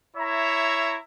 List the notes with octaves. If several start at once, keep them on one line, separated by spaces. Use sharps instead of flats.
E4 C#5 E5 A#5